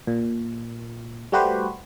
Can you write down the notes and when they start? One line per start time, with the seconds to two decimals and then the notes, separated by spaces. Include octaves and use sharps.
0.07 A#2
1.32 G3 A3 F#4 G4 B4 C5